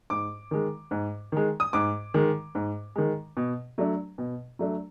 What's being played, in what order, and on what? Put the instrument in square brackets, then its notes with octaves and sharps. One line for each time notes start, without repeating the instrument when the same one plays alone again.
[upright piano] G#2 D6
D#3 G#3
G#2
D#3 G#3
D#6
G#2 D6
D#3 G#3
G#2
D#3 G#3
B2
F#3 A3 D4
B2
F#3 A3 D4